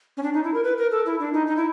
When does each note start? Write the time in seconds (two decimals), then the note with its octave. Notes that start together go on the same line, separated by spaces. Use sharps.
0.17 C#4
0.23 D4
0.34 D#4
0.44 E4
0.54 A#4
0.64 B4
0.78 A#4
0.91 A4
1.06 E4
1.20 D4
1.33 D#4
1.47 D#4
1.57 E4